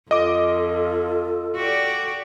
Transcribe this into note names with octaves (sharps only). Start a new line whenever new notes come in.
F2 F4 A4 D#5 D6
F#4 G4 D5